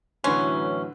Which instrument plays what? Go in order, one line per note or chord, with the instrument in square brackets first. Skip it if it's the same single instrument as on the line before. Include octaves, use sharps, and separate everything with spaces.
[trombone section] A2 E3 F#3 [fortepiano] D3 B4 C6 [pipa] C#4